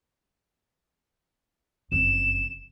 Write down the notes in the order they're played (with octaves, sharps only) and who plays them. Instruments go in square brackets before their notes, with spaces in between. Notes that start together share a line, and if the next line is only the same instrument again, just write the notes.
[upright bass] F#1 F2 [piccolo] E7